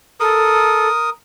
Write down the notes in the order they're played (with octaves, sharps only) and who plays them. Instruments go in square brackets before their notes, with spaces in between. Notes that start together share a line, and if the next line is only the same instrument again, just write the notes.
[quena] A4 [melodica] A#4 D#6